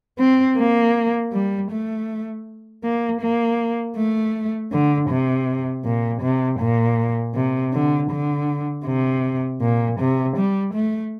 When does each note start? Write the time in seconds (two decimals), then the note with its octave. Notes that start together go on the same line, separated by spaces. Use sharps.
0.19 C4
0.57 A#3
1.32 G3
1.70 A3
2.83 A#3
3.21 A#3
3.96 A3
4.71 D3
5.10 C3
5.84 A#2
6.22 C3
6.59 A#2
7.34 C3
7.73 D3
8.10 D3
8.85 C3
9.61 A#2
9.99 C3
10.36 G3
10.74 A3